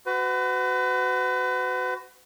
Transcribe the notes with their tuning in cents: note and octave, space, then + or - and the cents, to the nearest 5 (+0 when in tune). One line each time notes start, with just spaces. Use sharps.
F#4 +5 B4 +35